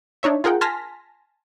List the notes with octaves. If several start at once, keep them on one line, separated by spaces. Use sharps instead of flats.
D4 D#4 C#5 E5
F4 G#4 A#4 F#5 G5
G#5 A5 C6 F6 A#6 B6